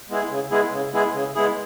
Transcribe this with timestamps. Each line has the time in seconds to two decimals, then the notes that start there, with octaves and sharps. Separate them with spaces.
0.09 G#3 B3 E4 G#4
0.30 C#3
0.51 G#3 B3 E4 G#4
0.72 C#3
0.93 G#3 B3 E4 G#4
1.14 C#3
1.35 G#3 B3 E4 G#4